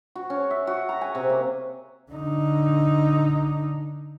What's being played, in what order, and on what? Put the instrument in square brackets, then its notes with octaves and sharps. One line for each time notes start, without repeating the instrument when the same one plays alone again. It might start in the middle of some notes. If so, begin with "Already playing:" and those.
[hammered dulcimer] F#4
C#4
E5
F#4
A#5
G#5
C3
A#3
[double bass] D3 D#4